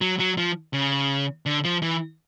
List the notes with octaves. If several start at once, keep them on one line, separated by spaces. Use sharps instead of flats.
F#3
F#3
F3
C#3
D3
F3
E3